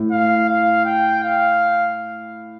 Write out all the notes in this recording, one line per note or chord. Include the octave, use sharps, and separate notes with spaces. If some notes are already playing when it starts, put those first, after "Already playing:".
Already playing: A2
F5
F5
G5
F5